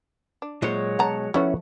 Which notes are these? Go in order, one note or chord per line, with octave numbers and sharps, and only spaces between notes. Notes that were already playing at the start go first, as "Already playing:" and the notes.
D4
A#2 F#3 G#3 F4 C5 C#5
B1 F#5 A5 A#5
F3 A3 B3 C#4 E4 F#4